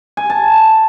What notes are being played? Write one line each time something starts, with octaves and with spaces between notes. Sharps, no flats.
G#5
A5